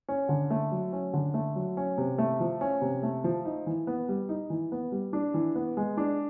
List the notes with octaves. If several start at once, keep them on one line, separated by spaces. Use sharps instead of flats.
C#4
D3
A3
F#3
C#4
D3
A3
F#3
C#4
C3
A3
F3
C#4
C3
A3
F3
D#4
E3
B3
G3
D#4
E3
B3
G3
D4
E3
B3
G#3
D4